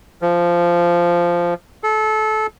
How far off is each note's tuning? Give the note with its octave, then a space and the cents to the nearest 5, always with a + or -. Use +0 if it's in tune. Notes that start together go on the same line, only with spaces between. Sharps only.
F3 -10
A4 -25